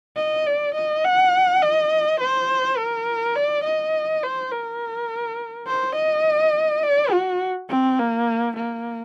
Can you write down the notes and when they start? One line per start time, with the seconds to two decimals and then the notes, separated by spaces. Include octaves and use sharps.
0.17 D#5
0.47 D5
0.75 D#5
1.05 F#5
1.62 D#5
2.21 C5
2.78 A#4
3.35 D5
3.64 D#5
4.23 C5
4.51 A#4
5.67 C5
5.96 D#5
6.83 D5
7.12 F#4
7.70 C4
8.00 A#3
8.57 A#3